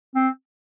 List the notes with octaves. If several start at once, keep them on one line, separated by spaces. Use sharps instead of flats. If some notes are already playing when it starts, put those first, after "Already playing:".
C4